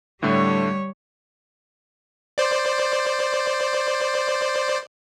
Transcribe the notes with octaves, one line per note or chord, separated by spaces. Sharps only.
A2 D3 G3 A3 C#5
C5 D5